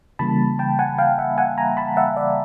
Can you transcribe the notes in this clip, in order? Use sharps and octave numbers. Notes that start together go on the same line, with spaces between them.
C#3 E3 G3 A#3 A5 B5
G5 A5
F#5 G#5
F5 G5
E5 F#5
F#5 G#5
G#5 A#5
A5 B5
E5 F#5
D5 E5